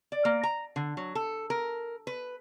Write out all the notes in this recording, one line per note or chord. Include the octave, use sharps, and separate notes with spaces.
D5
A#3
A#5
D3
F#3
A4
A#4
B4